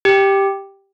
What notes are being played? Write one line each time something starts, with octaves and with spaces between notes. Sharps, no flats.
G4